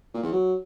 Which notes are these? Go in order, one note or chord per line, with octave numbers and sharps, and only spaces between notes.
A#2
E2
F#3